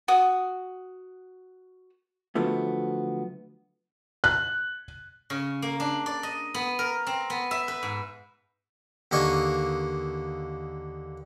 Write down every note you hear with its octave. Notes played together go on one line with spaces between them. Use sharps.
F#4 D#6
D3 F3 F#3 A3 B3
F#6
C#3
A#3
D4
D5
D#5
B3
A#4
C4
B3
E5
B4
G#2
D#2 D3 A#3 D#5 G#5 C#6